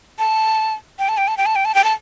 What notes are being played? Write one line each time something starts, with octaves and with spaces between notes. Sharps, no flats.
A5
G5
A5
G5
A5
G5
A5
G5
A5
G5
A5